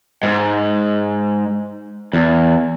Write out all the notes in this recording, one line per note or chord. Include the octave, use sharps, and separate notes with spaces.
G#2
E2